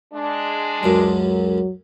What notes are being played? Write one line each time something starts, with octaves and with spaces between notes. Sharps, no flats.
G#3 D4
C#2 F#2 F#3